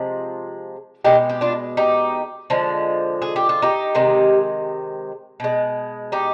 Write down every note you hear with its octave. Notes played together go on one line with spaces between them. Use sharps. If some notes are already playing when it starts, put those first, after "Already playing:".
Already playing: C3 F3 G#3
B2 G#3 D#4 G4
G4
D4 F4
D#4 G4
D3 F3 G#3
G#4
G4
F4
D#4 G4
C3 D#3 G#3
B2 G#3
D#4 G4